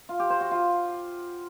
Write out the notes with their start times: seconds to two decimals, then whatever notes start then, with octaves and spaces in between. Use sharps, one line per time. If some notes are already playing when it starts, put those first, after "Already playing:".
0.09 F4
0.19 G4
0.30 C5
0.41 F#4
0.51 F4